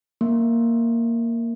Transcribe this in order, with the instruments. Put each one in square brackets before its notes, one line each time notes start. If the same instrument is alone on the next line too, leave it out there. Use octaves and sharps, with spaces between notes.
[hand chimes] A#3